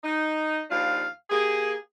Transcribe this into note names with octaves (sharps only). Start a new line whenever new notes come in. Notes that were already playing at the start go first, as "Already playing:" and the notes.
D#4
D#2 F3 D4 F4 F5
A#3 G4 G#4